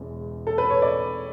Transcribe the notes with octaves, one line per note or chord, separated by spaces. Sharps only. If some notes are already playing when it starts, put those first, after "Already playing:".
Already playing: E1 E2 C#3
A4
B4
C#5
D5